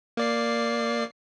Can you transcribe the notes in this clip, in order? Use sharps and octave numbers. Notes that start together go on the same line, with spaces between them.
A#3 D5 C7